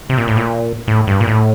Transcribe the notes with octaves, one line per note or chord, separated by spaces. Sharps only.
C3
A#2
A2
A#2
A2
G2
A#2
A2